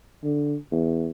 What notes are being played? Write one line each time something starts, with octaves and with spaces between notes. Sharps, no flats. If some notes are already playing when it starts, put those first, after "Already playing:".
D3
E2